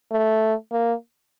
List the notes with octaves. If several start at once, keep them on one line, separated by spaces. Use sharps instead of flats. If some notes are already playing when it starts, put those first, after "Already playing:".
A3
A#3